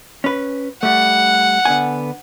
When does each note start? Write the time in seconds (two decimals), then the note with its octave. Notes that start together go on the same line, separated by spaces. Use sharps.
0.24 C#4 B4
0.83 G3 A3 F#5
1.65 D3 B3 G#5